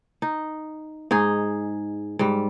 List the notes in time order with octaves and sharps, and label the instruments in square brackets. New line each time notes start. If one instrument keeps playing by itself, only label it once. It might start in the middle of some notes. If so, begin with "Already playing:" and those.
[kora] D#4
G#2 D#4 G#4
G#2 G3